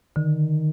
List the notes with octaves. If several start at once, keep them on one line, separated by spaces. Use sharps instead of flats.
D3 D#3